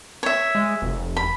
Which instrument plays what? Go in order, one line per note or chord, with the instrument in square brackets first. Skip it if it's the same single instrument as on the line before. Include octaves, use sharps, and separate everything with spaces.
[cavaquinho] C#5 E5
[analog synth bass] G#3
F1
[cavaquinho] B5